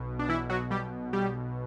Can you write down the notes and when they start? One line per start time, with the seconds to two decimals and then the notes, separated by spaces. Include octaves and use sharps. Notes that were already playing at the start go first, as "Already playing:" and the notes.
Already playing: B1 B2
0.19 D4
0.29 E3 E4
0.50 F#3 F#4
0.71 G3 G4
1.13 G3 G4